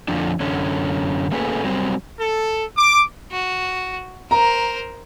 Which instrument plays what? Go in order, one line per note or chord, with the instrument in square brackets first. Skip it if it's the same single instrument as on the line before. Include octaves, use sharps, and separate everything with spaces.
[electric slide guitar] F2 A2 D3 F3 D4
F#2 D3 C#4
A3 A#3 C#4 G#4 A4 B4
F#3 G3 C4 C5
[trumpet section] A4
D6
[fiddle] F#4
[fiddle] A#4 C5 [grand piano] A#5